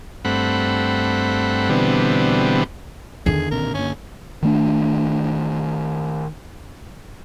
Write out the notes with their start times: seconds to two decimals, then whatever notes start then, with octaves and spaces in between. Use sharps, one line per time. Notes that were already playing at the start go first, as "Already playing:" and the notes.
0.25 G2 A3 C4 F#5 B5
1.70 B2 D3 E3 G3 B3 C4
3.26 E2 D3 D#3 G#4
3.51 B1 A#2 C4 A#4
3.74 G2 A#3 C#4
4.42 D#3 A3 D4